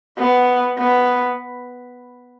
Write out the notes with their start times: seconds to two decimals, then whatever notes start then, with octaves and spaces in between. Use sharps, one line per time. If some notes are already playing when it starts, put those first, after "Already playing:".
0.19 B3
0.79 B3